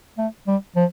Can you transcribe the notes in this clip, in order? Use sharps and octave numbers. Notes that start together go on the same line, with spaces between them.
A3
G3
F3